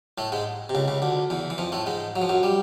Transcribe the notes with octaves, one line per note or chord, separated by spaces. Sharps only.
A2 A3
G#2 G#3
C3
C#2 C#3
C#2 C#3
D2 D3
E2 E3
E3
F2 F3
A2 A3
G#2 G#3
F#3
F3
F#2 F#3
G3